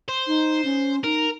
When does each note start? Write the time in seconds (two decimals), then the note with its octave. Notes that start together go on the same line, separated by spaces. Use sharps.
0.08 C5
0.27 D#4
0.65 C#4
1.04 D#4 A#4